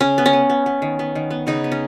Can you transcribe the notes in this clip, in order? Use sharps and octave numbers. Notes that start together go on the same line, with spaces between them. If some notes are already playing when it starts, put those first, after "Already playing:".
C#3 C#4
B3
C#4
B3
B3
B3
D#3
B3
D#3
B3
C#3 D#4
B3
C#4